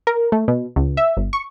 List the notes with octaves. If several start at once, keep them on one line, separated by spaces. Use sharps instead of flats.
A#4
A3
B2
C#2
E5
G1
C#6